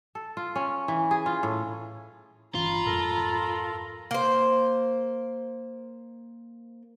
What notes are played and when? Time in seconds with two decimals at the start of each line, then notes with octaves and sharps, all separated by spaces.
0.15 A4
0.37 F4
0.56 C#4
0.88 E3
1.11 G#4
1.26 F4
1.43 A2
2.55 G1 E3 C#4 F4 A#5 B5
2.86 F2 G#2 A4 A#4
4.11 A#3 C5